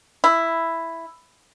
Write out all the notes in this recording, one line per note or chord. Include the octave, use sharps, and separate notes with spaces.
E4